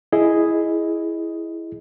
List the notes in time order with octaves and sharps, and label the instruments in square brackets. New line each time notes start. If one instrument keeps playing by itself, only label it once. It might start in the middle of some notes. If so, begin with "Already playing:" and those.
[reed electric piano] E4 G#4 D#5